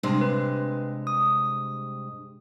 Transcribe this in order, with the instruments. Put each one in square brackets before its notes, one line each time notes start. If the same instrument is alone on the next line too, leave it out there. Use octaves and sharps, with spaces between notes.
[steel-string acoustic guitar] G2 C3 G#3
[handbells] B4
D#6